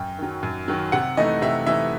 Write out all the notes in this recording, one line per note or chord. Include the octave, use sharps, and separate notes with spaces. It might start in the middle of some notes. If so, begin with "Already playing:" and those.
Already playing: F#2 G5
D#3 F#3
F#2
D#3 F#3
C3 F#5
E3 A3 D#4 D#5
C3 E5
E3 A3 D#4 E5